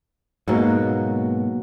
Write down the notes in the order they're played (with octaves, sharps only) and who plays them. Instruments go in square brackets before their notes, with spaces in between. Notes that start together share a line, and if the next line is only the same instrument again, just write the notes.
[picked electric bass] G#2 B2 [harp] F#3 A#3